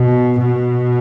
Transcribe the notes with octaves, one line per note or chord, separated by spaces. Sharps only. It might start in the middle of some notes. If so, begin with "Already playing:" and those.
Already playing: B2
B2